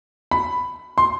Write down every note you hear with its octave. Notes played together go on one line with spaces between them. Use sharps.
B5
C6